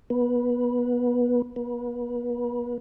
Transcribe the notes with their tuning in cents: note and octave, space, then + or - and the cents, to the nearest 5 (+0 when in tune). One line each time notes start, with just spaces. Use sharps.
B3 -20
B3 -40